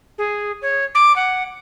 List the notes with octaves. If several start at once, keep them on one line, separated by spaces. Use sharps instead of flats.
G#4
C#5
D6
F#5